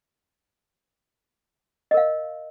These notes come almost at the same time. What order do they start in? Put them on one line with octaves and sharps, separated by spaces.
D#5 A#4 F5